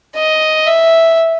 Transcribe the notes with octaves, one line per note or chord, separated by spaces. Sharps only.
D#5
E5